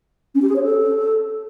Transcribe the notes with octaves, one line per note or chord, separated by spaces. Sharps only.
C#4
G4
G#4
C#5
A4